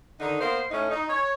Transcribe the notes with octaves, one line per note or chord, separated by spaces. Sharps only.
D3 D#3 D#4
A#3 B3 C5
A2 A3 C#4 D#4
D#4
C#5